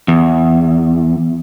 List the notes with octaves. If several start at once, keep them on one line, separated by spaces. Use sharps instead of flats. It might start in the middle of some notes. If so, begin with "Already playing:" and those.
E2